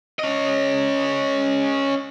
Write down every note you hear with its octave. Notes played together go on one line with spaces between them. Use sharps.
C#4 D#5